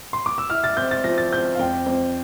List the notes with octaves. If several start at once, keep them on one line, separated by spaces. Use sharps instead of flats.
C6
D6
E6
E4 F6
A6
C4 G6
A6
F3 A#6
A6
C4 G6
F5
F2 G5
F2